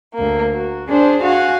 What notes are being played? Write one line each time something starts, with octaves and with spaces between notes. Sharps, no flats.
D2 A#3
F#4
D4 G#4 C5
F#4 F5 F#5 G#5